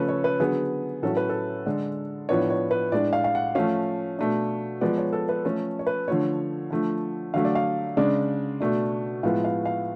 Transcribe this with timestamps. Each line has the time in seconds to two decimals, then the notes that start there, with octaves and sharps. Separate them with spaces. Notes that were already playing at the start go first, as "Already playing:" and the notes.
Already playing: C#3 F3 A3 C#4 A4 B4
0.09 C#5
0.24 B4
0.40 D3 F#3 B3 G#4
1.02 A2 F#3 C#4 A4
1.17 B4
1.29 A4
1.66 D3 G#3 D4
2.29 A2 F3 B3 D4 C#5
2.50 C#5
2.71 B4
2.92 A2 G#3 D4 D5
3.13 F5
3.24 F5
3.35 F#5
3.55 F3 A3 C#4 F5
4.19 B2 A3 D4
4.81 F3 G#3 B3 D5
4.97 C#5
5.13 A4
5.29 B4
5.44 F3 A3 C#4 A4
5.79 C#5
5.87 B4
6.08 D3 F3 A3 C#5
6.70 D3 F3 A3
7.34 D3 F#3 A3 F5
7.45 D5
7.55 F5
7.97 C#3 G#3 D4 D5
8.61 B2 A3 D4
9.23 A2 F3 G#3 B3 F5
9.44 F5
9.65 F5